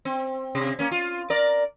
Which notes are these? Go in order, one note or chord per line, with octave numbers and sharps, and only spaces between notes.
C4
C3
A#3 C#4
F4
A#4 D5